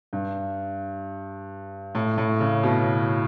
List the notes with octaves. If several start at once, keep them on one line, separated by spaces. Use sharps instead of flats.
G2
A2
A2
C#3
B2